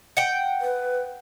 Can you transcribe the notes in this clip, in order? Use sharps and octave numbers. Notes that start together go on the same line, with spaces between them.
F#5 G5
B4